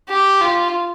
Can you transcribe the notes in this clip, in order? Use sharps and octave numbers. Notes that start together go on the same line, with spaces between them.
G4
F4